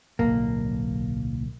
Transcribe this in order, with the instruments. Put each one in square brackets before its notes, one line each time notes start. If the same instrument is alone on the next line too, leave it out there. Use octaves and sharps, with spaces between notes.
[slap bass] D1 B1 [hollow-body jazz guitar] A#3